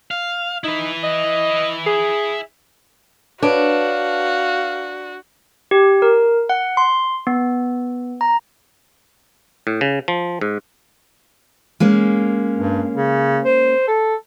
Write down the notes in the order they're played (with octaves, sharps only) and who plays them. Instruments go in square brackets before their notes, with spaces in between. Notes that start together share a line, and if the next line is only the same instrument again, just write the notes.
[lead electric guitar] F5
[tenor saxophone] D#4 [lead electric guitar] E4 B4
[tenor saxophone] D#5
G#4
[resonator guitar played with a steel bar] D4 [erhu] F#4 [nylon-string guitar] B4 C#5 [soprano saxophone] F5
[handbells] G4
A#4
F#5
C6
B3
A#5
[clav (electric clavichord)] A2
C#3
F3
G#2
[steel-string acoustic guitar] G#3 A#3 C#4
[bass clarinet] G2
C#3
C5
A4